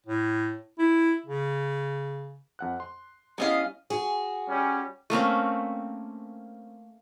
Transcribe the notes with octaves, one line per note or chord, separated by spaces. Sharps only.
A2
E4
C#3
F2 F#5 F#6
C6
G3 B3 C#4 E4 D#5 F5
F#4 G#4
G3 C#4
A3 A#3 C4 C#4